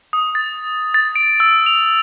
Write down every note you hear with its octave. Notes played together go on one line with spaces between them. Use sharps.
D#6
A6
A6
D7
E6
F7